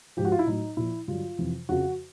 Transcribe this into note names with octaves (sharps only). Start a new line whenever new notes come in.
G#2 F3 G4
F#4
F4
E4
A2 F#3 D#4
A#2 F3 E4
G2 D3 F#3 F4
F2 C3 E3
F2 C#3 F3 F#4